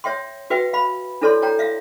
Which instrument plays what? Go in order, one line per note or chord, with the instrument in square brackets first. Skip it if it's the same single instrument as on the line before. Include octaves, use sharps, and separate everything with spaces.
[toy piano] C#5 E5 G5 C6
F#4 B4 E5 G5
F5 B5
D4 E4 A4 C#5 D5 C6
C#5 G5 A#5
E5 F5